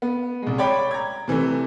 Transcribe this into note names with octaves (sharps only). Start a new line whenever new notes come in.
B3
C2 G#3
C#5 D5 G5 B5
A#5 G#6
C3 E3 G3 A3